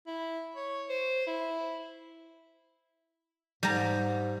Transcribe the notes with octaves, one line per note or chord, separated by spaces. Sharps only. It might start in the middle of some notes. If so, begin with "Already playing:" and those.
E4
C#5
C5
E4
G#2 G3 A#5